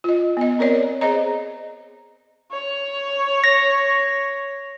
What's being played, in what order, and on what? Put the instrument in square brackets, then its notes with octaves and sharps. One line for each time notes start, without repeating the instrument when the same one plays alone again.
[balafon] F4 D#5
B3 D#5
C4 A#4 C#5 D5
G#4 C5 D#5 A#5
[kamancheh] C#5
[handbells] A#6